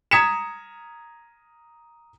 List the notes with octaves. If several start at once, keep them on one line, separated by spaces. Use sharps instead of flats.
A#5 D#6 G#6 B6 C#7 E7